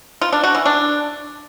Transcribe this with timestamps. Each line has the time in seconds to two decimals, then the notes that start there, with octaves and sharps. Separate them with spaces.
0.21 F4
0.33 D4
0.44 F#4
0.55 E3
0.66 D4